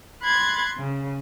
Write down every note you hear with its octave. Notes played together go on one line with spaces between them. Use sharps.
B5 C6 F#6 G#6 A6
C#3